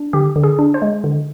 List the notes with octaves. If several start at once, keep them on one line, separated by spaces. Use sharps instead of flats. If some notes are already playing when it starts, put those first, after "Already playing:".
Already playing: D4
D3 G4
D3
G#4
D4
C5
G#3
D3